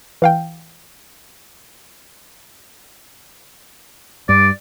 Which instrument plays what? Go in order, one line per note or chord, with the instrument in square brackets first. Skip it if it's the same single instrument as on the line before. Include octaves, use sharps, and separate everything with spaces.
[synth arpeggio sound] E3 F5 G5
[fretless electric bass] G2 [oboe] D5